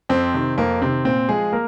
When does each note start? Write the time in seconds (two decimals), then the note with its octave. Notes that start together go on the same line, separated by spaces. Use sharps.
0.09 F2 C4
0.34 C3 D#3
0.58 F2 A#3
0.82 C3 D#3 C4
1.05 A#2 C4
1.29 F3 G#3 G#4
1.53 A#3 A#4